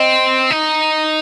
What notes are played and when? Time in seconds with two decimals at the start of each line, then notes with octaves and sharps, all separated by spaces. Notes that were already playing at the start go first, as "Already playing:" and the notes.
Already playing: C4 D#5
0.51 D#4